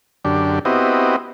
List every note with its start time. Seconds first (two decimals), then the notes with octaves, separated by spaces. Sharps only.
0.25 F#2 D3 D4 G4
0.65 B3 C4 E4 F#4 G4 D#5